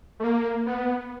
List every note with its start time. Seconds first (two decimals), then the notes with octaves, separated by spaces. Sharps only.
0.20 A3
0.24 A#3
0.66 B3